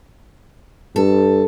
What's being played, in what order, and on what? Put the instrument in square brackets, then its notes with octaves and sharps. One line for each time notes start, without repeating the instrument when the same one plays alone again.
[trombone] G2 [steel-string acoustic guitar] A4